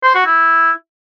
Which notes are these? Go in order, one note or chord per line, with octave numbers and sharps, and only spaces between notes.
C5
F#4
E4